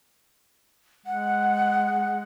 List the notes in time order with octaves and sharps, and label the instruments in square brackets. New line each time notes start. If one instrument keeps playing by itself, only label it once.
[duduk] G#3 [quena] F#5